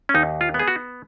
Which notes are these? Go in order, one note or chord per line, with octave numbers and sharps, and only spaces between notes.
C#4
D#2 D#4
F4
B3
G#4
F#4